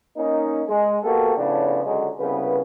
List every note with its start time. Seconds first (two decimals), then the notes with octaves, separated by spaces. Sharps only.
0.17 A#3 C#4 D#4
0.69 G#3
1.03 A#3 B3 F#4 G4 A4
1.37 A2 C#3 F3 B3 D4
1.85 C#2 D3 F#3 G#3
2.20 C2 C#3 B3 B4